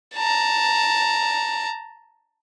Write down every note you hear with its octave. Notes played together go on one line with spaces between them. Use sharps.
A5 A#5